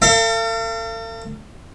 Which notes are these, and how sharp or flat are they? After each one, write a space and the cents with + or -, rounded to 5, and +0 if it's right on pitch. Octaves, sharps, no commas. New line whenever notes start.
A4 +40 F5 -40